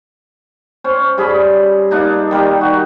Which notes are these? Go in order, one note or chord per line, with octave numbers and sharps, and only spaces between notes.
C#4 C5
G2 G#4 B5
A#3 D4 D#4
D#3 G3 A#3 D#4
F#4